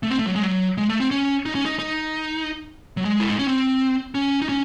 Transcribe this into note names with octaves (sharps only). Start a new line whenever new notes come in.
A3
C4
A3
F#3
G#3
F#3
G#3
A3
C4
C#4
D#4
C#4
D#4
D#4
F#3
G#3
E4
D#4
C#4
C4
C#4
D#4
C#4